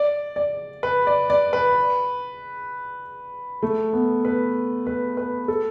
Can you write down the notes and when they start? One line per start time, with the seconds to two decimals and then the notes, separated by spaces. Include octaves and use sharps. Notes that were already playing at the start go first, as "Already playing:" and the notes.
Already playing: D5
0.36 D5
0.83 B4
1.07 D5
1.30 D5
1.53 B4
3.62 A3
3.93 B3
4.25 B4
4.87 B4
5.17 B4
5.48 A4